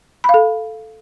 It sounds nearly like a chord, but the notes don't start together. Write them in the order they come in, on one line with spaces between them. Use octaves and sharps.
B5 F5 A4